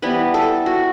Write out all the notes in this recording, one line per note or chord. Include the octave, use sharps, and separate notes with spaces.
E3 G3 B3 B4
A4
F#4